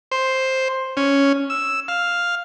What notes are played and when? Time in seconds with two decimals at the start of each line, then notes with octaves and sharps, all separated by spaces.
0.12 C5
0.97 C#4
1.50 E6
1.88 F5